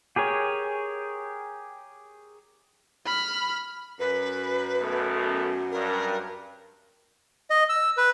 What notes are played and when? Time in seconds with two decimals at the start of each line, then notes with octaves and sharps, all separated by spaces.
0.16 G4 G#4 A#4 C#5
3.06 B5 F6
3.99 F#2 B4
4.80 B1 B2 A3
5.72 G2 A#4
7.50 D#5
7.69 E6
7.97 B4